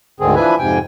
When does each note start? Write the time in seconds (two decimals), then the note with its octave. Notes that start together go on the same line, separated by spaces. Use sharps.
0.20 D2 G#2 D3 D#3 C4 G#4
0.36 E3 F3 D4 B4 E5 G#5
0.59 F2 G#2 C3 G5 G#5